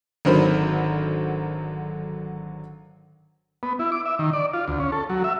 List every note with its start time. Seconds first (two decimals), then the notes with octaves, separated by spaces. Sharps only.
0.25 G#1 D3 F#3 A#4 C5 B5
3.63 B3
3.79 E4
3.92 D6
4.06 E5
4.19 D#3
4.33 D5
4.54 F4
4.68 D2
4.80 C#4
4.92 A4
5.10 F#3
5.24 E5